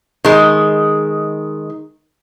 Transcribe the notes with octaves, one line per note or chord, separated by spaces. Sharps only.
D#3 G#3